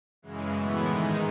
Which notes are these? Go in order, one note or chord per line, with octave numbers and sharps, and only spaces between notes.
F#2 C#3 E3 G#3
A2 E3 B3 E4
G#2 D#3 G#3 D#4